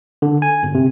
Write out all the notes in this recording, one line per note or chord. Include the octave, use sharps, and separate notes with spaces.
D3
G#5
G1
C3